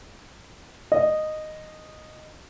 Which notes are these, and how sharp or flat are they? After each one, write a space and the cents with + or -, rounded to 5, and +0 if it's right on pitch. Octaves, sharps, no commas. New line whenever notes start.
D#5 -10